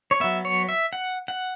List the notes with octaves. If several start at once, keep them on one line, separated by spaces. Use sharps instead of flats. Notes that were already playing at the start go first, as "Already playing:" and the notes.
C#5
F#3 B3 E5
C#5
E5
F#5
F#5